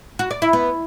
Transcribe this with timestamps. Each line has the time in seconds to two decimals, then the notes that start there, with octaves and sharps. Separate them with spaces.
0.19 F#4
0.31 D5
0.42 E4
0.53 B3